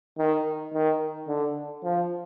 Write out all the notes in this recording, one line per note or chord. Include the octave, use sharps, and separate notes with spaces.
D#3
D#3
D3
F3